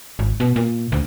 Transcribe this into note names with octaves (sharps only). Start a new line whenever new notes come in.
G#1
B2
A#2
D2